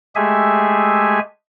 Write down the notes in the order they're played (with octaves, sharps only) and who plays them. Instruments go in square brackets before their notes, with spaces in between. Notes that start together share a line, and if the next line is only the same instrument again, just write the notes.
[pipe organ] G#3 A3 G4 G#4 E5 G#5